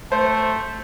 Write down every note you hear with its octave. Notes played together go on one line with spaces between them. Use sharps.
A3 C5